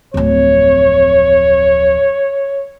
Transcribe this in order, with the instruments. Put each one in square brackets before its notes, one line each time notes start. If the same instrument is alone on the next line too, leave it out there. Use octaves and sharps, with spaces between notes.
[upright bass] D1 F2 [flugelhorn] C#5